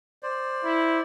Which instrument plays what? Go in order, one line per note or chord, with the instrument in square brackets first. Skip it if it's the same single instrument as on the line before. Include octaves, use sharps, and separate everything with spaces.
[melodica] C5 D5
[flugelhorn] E4